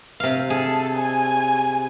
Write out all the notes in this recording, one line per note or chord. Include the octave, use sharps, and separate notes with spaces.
C3 F5
G#4 A4
G#5